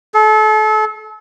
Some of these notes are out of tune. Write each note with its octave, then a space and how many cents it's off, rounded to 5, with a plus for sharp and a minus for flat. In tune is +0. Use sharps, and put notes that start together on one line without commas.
A4 -35